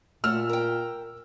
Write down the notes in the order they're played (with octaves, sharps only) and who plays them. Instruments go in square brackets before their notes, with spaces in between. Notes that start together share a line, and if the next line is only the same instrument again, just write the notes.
[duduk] A#2 [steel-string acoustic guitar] A3 F#5 [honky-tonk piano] E6 F6
[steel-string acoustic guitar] A#4 G5